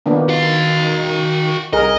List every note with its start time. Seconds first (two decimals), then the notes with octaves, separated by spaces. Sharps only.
0.06 D#3 A#3 B3 D4
0.29 F#4 F5
1.73 C2 G#4 A#4 D#5